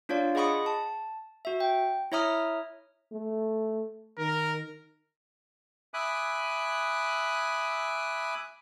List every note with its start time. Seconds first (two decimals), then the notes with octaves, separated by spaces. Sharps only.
0.09 D4 F4 C#5 D5 F5
0.35 G#4 D#5 F#5 B5 C#6 D#6
0.66 A5
1.45 F#4 E5
1.60 G5
2.12 E4 C#5 E5 A#5 D#6 F6
3.12 A3
4.18 D#3 A#4
5.94 E5 G#5 B5 D6 D#6 F#6